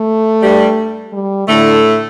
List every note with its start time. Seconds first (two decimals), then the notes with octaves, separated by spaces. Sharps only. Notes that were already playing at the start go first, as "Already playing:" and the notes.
Already playing: A3
0.42 G2 G3
1.13 G3
1.48 A2 D3 A3